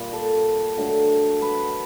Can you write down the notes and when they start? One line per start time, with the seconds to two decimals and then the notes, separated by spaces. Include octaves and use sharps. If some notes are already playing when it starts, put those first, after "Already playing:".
Already playing: A#2 G3
0.13 A4
0.77 D3 F#3 A3
1.42 B4